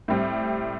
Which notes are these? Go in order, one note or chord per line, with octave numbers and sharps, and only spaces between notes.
A2 G3 C4